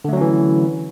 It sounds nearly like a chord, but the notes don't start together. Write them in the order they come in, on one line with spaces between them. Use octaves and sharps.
D3 A3 F#3 C#4 E3